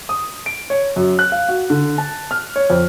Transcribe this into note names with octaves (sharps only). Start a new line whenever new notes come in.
D#6
D7
C#5
F#2
F#6
F5
F#4
D3
A5
F6
C#5
F2